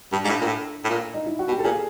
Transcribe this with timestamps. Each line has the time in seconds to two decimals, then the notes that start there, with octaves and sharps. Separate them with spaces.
0.12 G2 D4
0.25 G#2
0.29 A2
0.41 A#2
0.47 A2
0.85 A2
0.89 A#2
1.14 D#4
1.26 E4
1.39 F#4
1.48 B2
1.51 G4
1.59 A4
1.64 A#2 G#4